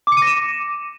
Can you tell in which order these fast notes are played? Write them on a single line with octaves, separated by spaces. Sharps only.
D6 C#7 D#7 A#6 E7